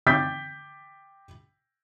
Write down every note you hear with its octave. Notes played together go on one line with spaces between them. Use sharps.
G5 D6 G6 A6 B6